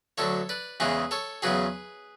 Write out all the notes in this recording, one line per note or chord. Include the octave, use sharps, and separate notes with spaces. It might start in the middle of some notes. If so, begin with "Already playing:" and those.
D2 D3 F#3 A4 C#5
B4 D5
E2 C#3 E3 G#3 G#4 B4
A4 C#5
E2 C#3 F#3 G#4 B4